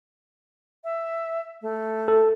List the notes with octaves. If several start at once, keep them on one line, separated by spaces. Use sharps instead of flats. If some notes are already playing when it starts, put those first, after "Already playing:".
E5
A3
A4